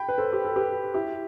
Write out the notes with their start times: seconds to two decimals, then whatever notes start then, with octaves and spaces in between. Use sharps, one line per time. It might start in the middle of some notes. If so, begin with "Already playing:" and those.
Already playing: G5 B5
0.09 B4
0.18 A4 C5
0.33 G4
0.45 A4
0.56 G4 B4
0.94 E4 G4